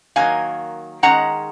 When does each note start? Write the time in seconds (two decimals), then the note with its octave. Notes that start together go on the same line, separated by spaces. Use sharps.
0.16 D#3 F#3 A#3 F5 G#5
1.03 D#3 G#3 C#4 F#5 A#5